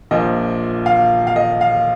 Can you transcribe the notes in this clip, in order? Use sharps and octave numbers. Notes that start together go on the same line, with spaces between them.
A#1 A#2 F3 D#5
F5
F5
D#5
F5